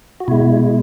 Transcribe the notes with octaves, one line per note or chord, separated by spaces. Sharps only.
F#4
B2 G#3 E4